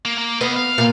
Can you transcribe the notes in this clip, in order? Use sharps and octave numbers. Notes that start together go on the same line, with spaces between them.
A#3
A#3
B3 D#5 F5
F5
A#2